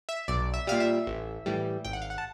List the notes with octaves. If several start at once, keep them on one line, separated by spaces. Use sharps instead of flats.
E5
B1 D5
E5
A#2 G3 F5
E5
A1
A2 E3 G3
G#1 G5
F#5
F5
F#5
A5